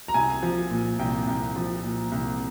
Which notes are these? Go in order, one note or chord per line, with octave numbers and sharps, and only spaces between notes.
A#5
C2 G#5
F3
A#2
C2 G5
C2
F3
A#2
C2